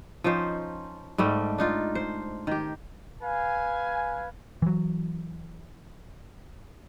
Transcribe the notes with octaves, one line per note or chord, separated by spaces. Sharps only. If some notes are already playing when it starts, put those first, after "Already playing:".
F3 C#4 D#4 C5
G#2 G3 A3 D#5
D4 D#4 F4
C5
D#3 G4
B4 F5 G#5
E3 F#3